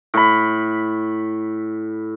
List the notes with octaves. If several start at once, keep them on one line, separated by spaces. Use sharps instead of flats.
A2 B5